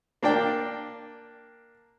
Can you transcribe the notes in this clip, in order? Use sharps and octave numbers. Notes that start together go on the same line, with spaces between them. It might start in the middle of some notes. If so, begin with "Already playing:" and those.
A#3 D4 D5 G5